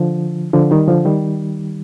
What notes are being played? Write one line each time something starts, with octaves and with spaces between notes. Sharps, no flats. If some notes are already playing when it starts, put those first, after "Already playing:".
Already playing: D3 F3
D3 F3
D#3 G3
D3 F3
D#3 G3